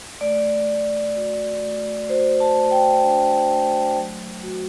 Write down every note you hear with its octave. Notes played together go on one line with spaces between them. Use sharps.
A3 D5
A3
F#4
A3
F#4 C5
A5
A3
G5
D4
A3
F#3
F#4